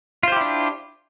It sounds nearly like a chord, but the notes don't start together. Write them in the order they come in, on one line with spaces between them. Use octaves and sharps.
F4 C5 G4 E4 D4